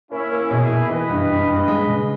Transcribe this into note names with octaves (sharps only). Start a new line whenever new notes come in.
A#3 C#4 E4
A#3
B2 E4 G#4
B2
E3 B4 D#5
G2
G2
G2
G#3
C#3